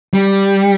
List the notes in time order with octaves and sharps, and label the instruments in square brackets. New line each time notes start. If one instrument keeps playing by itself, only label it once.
[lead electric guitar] G3